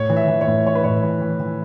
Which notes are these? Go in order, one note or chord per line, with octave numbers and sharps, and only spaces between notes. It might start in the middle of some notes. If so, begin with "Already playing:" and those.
Already playing: A2 C#5
E3
E5
E3
C#5
A2
E3 C#5
B4
A2 C#5
E3
E3
E3